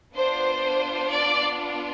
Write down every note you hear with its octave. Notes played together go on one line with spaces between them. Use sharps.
B3 D4 F4 C5
D5